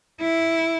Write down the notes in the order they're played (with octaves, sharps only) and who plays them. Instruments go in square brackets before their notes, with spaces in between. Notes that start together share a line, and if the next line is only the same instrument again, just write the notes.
[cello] E4